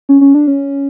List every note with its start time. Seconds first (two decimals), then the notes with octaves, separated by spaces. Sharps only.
0.09 C#4
0.21 C#4
0.34 D4
0.47 C#4